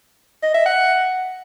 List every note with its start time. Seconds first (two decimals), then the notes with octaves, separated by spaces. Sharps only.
0.43 D#5
0.55 E5
0.66 F#5